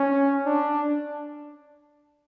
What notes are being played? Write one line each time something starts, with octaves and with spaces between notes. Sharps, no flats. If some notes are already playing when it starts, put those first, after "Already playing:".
Already playing: C#4
D4